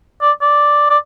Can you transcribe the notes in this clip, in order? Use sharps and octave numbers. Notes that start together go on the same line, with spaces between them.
D5
D5
D5